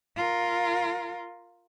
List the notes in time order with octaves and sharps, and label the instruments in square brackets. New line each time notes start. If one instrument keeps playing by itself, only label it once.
[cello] F4 A#4